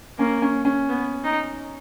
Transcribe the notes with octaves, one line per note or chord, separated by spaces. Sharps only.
A#3 C#4
C#4
C#4
B3
D#4